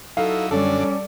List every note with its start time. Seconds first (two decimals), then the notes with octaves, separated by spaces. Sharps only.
0.17 F#3 D#4 E4 A4 F5
0.51 F#2 D3 G3 C#4 D4 A4 D5